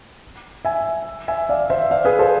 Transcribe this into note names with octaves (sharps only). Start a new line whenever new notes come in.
E5 G#5
E5 G#5
D5 F5
C5 E5
D5 F5
G#4 B4
A4 C5